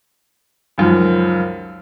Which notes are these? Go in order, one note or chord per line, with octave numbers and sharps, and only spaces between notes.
C#2 F#2 D#3 F3